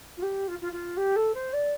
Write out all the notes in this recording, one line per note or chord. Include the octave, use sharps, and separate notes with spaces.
F4
G4
F4
F4
F4
G4
A4
C5
D5